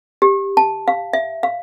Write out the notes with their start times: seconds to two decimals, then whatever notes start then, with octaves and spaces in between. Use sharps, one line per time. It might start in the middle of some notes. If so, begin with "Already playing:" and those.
0.22 G4
0.57 A5
0.88 F5
1.13 E5
1.43 F5